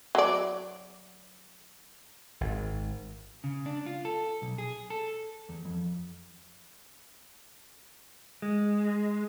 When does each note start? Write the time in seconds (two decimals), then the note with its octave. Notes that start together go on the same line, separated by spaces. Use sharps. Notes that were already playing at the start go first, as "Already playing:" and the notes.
0.15 F#3 D5
2.41 G#1
3.44 C#3
3.66 D4
3.86 F4
4.05 A4
4.42 B1
4.58 G#4
4.90 A4
5.49 E2
5.65 F2
8.42 G#3